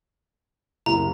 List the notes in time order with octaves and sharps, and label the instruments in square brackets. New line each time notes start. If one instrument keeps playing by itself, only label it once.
[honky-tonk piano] F#1 C2 [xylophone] A#5